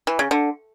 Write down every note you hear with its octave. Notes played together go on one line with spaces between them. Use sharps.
E3
C#3
D3